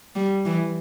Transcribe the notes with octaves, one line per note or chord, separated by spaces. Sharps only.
G3
E3